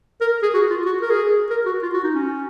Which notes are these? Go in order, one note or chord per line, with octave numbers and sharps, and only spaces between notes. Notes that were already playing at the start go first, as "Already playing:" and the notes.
A#4
G#4
F#4
F4
F#4
A#4
G#4
A#4
F#4
F4
F#4
D#4
C#4